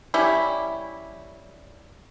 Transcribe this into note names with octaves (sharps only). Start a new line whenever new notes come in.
G3 C#4 E4